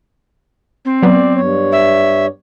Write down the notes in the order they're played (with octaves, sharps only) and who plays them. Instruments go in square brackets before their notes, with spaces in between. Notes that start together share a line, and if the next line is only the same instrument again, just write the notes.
[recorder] C4
[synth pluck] F#3 B3 [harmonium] D5
[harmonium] G2 C#5
[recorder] E5